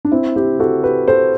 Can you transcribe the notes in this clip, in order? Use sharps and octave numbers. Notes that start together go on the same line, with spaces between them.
D4
C4 E4
E4 G4
F#4 A4
G4 B4
A4 C5